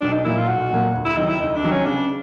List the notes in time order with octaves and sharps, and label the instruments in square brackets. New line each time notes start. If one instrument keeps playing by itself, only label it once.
[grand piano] B1 [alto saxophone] D4
[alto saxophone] D#4
[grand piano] A#2 F#3 A#3 [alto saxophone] E4
[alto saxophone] F4
[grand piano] B1 [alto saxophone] F#4
[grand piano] A#2 F#3 A#3
D2
[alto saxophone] E4
[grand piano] C3 D#3 F#3 [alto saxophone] D#4
[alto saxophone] E4
[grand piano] D2 [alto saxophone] D#4
[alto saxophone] D4
[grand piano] C3 D#3 F#3
[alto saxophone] C#4
[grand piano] C#3 [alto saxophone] D4